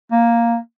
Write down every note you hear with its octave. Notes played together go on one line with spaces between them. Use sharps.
A#3